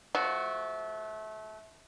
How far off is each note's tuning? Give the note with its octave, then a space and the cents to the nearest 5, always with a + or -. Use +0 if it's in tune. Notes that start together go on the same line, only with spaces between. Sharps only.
F3 +0 A3 -25 F#4 +0